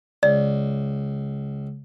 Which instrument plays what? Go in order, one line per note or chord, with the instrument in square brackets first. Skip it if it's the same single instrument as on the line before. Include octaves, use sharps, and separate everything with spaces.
[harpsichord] C#2 [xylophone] D5